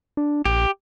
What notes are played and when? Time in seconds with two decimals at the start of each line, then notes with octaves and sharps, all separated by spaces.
0.17 D4
0.45 A#1 G4